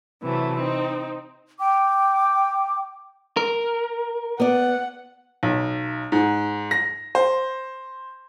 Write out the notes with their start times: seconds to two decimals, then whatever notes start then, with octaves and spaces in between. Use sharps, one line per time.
0.22 C3 E3 F#3 A3
0.56 C4 D#4
1.60 G5 D6
3.37 A#4
4.40 B3 D5 F#5
5.43 B1
6.12 G#2
6.71 A#6
7.15 C5